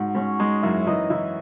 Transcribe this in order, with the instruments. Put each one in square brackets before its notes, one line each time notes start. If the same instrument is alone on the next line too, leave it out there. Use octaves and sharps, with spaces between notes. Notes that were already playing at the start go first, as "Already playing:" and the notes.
Already playing: [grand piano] G#2 [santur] F#3 F#4
[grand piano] G#2 [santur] C#4 C#5
[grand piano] G#3 [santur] D#4 D#5
[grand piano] F#2 [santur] E4 E5
[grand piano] E3 [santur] D#4 D#5
[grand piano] E3 [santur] E4 E5